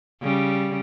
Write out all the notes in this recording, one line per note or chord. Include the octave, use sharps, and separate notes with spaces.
C#3 G3